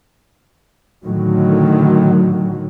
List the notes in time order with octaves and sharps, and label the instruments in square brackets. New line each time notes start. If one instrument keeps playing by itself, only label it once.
[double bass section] A2 D3 D#3 F#3